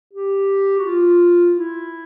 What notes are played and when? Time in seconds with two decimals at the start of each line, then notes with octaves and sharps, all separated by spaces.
0.13 G4
0.78 F#4
0.85 F4
1.56 E4